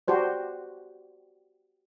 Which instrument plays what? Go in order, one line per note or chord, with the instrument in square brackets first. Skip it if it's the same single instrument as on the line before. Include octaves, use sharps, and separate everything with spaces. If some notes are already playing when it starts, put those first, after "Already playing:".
[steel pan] F#4 G4 C5 D5